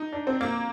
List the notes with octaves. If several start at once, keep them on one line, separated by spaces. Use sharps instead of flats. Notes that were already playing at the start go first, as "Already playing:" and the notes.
Already playing: D#4
D4
C4
A#3